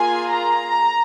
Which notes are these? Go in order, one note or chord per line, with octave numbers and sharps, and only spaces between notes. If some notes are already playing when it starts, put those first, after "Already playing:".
Already playing: A#3 F4 G#4 G#5
A#5